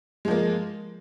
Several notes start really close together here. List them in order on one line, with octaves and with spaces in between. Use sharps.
G#3 F3 A#3